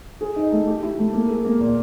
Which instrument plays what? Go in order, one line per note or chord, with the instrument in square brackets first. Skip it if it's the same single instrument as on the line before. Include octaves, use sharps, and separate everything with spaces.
[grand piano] G#4
D#4
A3
G4
E4
A3
A#3
G#4
A#3
A#2